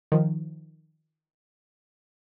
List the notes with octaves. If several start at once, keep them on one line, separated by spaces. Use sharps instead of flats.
D#3 F3